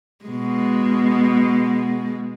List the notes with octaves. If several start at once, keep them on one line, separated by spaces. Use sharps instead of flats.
B2 G#3